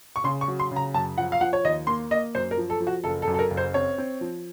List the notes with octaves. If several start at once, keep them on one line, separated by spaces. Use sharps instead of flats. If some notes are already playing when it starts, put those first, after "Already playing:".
C#6
C#3 C6
C#6
F#3
C6
C#3 A#5
F#2 A5
F3 F#5
F5
F3 F#5
C#5
D#2 D#5
A#3 C6
A#3 D#5
F#2 C5
A#4
F3
A4
F3
F#4
F#1 A4
A4
F#2
A4
A#4
F#1
C5
C4 C#5
C4
F3